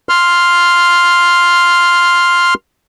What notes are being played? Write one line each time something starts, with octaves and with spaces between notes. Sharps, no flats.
C6 F6